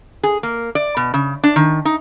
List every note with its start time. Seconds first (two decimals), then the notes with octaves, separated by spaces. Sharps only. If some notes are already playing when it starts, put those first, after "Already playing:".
0.23 G#4
0.43 A#3
0.75 D5
0.97 B2
1.14 C#3
1.43 D4
1.56 D#3
1.85 D#4